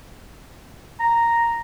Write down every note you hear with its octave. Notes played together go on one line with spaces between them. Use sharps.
A#5